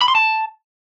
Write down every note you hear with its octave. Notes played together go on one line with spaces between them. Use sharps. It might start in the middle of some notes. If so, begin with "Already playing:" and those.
B5
C6
A5